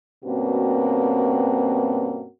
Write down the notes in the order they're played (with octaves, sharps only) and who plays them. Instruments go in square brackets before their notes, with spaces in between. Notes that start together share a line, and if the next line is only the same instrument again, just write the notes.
[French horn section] G2 B2 A#3 C4 C#4 F#4